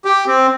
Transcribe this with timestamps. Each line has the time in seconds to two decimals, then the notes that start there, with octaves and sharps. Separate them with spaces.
0.05 G4
0.27 C4